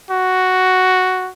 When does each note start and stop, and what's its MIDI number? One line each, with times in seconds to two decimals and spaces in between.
0.11 1.30 66